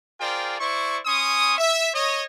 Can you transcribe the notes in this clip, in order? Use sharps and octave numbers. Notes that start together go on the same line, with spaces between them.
F4 G#4 A#4 C5 D5 G5
E4 C5 D5 C#6
C#4 G#5 C6 C#6 D#6
E5
C#5 D#5